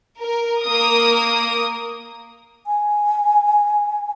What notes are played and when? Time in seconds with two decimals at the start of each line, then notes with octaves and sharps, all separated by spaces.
0.18 A#4
0.63 A#3 A#4 D#6
2.66 G#5